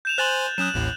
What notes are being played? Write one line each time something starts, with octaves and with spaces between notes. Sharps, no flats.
G6 E7 F7
C5 G#5 C6 F#6 A6 F#7
F#3 C#4 D#6 F#6 E7
A1 D#2 A2